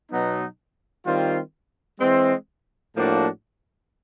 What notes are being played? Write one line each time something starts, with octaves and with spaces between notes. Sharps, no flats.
B2 F#3 B3 D#4
D#3 G3 C4 F4
E3 G#3 C4
A2 F3 A#3 D4 F#4